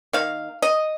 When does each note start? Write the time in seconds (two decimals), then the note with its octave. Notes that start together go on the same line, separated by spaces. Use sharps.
0.13 D#3 A#3 F5
0.62 D#5